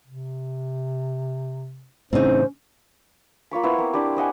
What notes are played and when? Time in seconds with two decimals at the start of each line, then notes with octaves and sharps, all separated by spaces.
0.06 C3
2.13 A2 C#3 E3 C4 C#4 D#4 C5
3.51 A#3 F4 C#5 B5
3.63 B3 E4 C5 C#5
3.78 A#3 C4
3.94 D4 E4 G4
4.16 C5 D#5 F#5 G#5